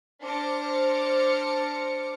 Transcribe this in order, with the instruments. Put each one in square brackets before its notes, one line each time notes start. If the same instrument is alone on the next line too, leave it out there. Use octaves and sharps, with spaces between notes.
[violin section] D4 C5 D6 F6 A#6 C#7